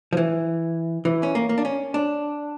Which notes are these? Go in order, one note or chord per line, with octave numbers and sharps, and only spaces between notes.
F3
E3
E3
C#4
A#3
A#3
D4
C#4
D4